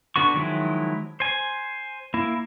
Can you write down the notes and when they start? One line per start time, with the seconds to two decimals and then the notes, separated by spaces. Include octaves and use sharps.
0.16 D3 B3 F#4 C#6
0.34 D#3 F3 F#3 G#3 E4
1.20 C5 G#5
2.14 A#3 E4